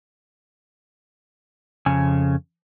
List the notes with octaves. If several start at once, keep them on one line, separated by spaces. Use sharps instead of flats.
F2 C#3 G#5